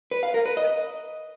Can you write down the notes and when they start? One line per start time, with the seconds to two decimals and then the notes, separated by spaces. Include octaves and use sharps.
0.11 B4
0.23 F5
0.34 A#4
0.46 B4
0.57 D#5